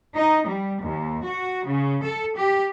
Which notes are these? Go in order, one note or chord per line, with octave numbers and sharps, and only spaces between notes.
D#4
G3
D#2
F#4
C#3
A4
G4